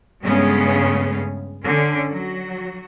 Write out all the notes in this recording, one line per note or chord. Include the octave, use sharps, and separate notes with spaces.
G2 C#3 G#3 A3 B3 C#4
D3 C#4
F#3 F#4